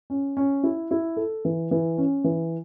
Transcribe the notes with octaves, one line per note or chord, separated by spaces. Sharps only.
C#4
C#4
E4
E4
A4
E3
E3
C#4
E3